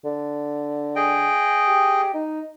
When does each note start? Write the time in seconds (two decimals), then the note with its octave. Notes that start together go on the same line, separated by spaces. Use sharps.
0.05 D3
0.96 G#4 D#5 G5
1.68 G4
2.14 D#4